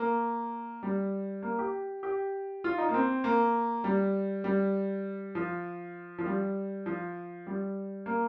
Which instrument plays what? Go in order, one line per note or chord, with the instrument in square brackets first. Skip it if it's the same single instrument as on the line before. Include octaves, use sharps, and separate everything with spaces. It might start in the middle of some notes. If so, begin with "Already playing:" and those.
Already playing: [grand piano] A#3
G3
A#3
G4
G4
F4
D#4
A#3
C4
A#3
G3
G3
F3
F3
G3
F3
G3
A#3